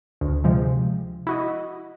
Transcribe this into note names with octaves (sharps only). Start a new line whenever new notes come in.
D2
C3 F3 G#3
E4 F#4 D#5